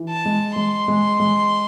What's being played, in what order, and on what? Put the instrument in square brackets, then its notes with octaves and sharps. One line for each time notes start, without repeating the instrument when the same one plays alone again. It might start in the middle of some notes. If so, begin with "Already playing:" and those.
Already playing: [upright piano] E3
[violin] A5
[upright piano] G#3
[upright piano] G#3 [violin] C6
[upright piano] G#3
G#3